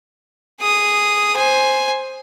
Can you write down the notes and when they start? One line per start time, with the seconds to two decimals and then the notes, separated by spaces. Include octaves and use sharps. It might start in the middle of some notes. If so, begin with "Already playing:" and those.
0.61 G#4 D#6
1.36 C5 G#5